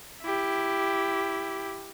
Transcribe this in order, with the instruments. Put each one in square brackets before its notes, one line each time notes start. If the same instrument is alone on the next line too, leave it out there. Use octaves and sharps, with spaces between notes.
[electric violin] E4 G4